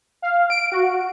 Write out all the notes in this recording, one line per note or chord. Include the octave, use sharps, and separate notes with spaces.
F5
D7
F#4